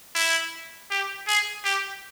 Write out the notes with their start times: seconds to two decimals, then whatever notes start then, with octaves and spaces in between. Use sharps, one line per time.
0.15 E4
0.91 G4
1.27 G#4
1.65 G4